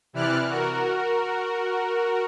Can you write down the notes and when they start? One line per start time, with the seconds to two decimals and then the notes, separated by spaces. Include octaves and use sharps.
0.13 C3 E3 E4 D5 F6 F#6
0.48 F#4 A#4